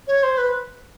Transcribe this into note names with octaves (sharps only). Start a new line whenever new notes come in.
C#5
C5
B4